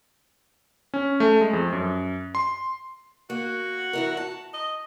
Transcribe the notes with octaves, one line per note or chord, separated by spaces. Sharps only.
C#4
A3
G#3
F2
F#2
C6
A#3 F#4
E2 E4 A#4
A5
D#5